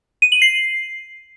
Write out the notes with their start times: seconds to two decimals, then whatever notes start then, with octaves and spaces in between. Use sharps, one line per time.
0.22 D#7
0.32 F#7
0.42 C7